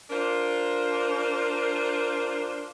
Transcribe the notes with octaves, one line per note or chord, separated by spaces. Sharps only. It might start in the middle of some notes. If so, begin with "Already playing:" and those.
D4 F4 A#4 C5